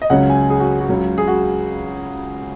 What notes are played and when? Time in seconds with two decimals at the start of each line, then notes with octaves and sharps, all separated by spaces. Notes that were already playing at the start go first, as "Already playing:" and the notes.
0.02 D#5
0.10 C#2 C#3 F#3 C#4 F#5
0.30 G#5
0.50 G#4
0.60 F#4
0.81 F#4
0.89 C#2 C#3 F#3
1.18 G#4
1.28 F#4